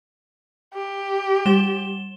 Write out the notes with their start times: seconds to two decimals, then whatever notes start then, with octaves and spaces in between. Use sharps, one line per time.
0.74 G4
1.46 G3 E7 G7